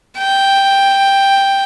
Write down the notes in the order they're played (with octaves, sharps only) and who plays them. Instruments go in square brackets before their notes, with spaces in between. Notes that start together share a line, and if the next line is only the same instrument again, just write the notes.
[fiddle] G5